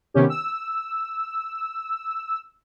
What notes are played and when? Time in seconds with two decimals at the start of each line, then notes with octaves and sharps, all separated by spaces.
0.14 C3 D#3 B3 C#4 G4
0.29 E6